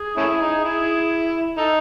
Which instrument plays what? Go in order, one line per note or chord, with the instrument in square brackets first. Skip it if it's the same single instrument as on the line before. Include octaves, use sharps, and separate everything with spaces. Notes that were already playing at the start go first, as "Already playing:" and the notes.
Already playing: [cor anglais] G#4
[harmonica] A3 C#4 E4
D#4
E4
[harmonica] D#4 [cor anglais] A4